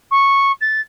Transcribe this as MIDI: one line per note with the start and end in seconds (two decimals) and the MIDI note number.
0.11 0.52 85
0.61 0.81 93